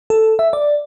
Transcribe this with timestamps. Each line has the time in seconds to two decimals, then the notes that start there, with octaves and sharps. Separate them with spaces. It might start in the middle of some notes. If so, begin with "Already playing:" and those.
0.10 A4
0.39 E5
0.53 D5